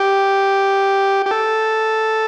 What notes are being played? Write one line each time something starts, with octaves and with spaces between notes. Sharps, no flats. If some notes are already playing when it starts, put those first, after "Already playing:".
Already playing: G4
G4
A4